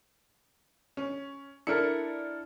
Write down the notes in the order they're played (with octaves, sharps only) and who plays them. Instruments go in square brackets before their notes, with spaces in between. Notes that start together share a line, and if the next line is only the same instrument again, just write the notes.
[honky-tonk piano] C#4
[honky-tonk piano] D4 C#7 [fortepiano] E4 A4 A#4